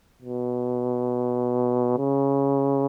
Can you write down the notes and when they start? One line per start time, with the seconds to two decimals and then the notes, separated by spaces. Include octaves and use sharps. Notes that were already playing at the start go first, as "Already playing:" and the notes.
0.22 B2
1.98 C#3